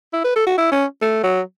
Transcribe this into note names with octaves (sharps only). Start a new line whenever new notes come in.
E4
B4
A4
F#4
E4
C#4
A3
F#3